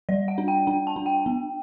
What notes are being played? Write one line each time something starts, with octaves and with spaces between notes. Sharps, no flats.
G3 D5
F#5
D4
G5
D4 G5
A5
D4
G5
B3